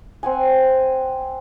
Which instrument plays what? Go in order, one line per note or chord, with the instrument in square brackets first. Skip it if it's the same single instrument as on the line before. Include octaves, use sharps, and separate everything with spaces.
[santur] C4 F#5 G#5